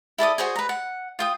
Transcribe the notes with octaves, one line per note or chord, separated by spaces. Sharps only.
E4 A4 D5 D#6
F#4 G#4 C5 G#5
B4 A#5
F#5
F4 G5 D#6